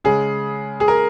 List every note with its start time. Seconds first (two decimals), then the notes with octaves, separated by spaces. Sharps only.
0.04 C#3 G#3 G#4
0.80 G#4
0.88 A#4